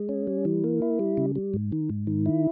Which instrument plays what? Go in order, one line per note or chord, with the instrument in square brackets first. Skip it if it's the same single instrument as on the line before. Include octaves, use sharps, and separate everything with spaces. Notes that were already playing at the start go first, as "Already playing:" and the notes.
Already playing: [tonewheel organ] G#3
C#4
G3
E3
A#3
E4
G3
C#3
G3
G#2
D#3
G#2
D#3
E4